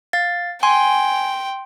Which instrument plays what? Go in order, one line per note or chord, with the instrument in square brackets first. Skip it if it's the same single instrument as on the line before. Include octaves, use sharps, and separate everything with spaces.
[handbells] F5 A6
[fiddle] G5 [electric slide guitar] G#5 [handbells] C6